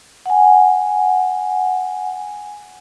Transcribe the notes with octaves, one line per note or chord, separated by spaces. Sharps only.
F#5 G#5